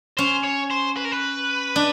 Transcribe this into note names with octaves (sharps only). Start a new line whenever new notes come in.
C#4 C5
C#5
C5
B4
A#4
B4
D4